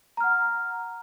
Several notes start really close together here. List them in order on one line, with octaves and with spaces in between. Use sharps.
A#5 F6 F#5